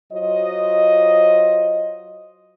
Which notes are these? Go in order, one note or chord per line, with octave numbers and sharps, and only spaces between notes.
F#3 F4 C5 D#5